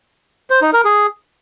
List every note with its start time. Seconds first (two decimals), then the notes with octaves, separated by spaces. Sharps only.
0.50 C5
0.62 D#4
0.73 A#4
0.85 G#4